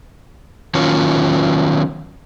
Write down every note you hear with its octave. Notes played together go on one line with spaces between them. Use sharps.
D#3 F#3 C#4 F4 C#5